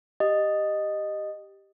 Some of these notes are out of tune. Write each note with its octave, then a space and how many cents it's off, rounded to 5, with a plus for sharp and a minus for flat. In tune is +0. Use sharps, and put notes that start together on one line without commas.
G4 +0 D#5 -10